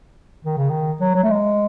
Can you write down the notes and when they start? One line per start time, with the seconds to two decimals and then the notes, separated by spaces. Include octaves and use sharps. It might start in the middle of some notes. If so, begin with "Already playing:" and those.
0.45 D#3
0.57 C#3
0.70 D#3
1.01 F#3
1.15 F#3
1.23 A3
1.30 G#3